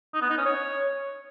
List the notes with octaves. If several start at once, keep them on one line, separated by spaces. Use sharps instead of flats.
D#4
B3
D#4
C#4
C#5